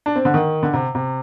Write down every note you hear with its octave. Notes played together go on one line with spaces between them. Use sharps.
D4
C4
D3
D#3
D3
C3
C3